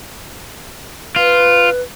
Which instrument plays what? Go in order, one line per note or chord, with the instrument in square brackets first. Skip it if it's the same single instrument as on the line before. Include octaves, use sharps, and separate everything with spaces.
[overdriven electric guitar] F4 [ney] B4